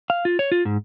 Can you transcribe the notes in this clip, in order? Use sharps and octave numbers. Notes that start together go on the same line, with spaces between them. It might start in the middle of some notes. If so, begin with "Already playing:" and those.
F5
F4
C#5
F4
G#2